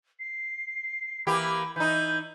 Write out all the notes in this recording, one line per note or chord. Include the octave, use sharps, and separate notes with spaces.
C7
E3 A#3 G4 B5
E3 D#4 G6